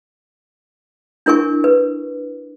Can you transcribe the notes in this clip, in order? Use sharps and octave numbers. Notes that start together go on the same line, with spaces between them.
D4 E4 A#4 G#5 C#6
B4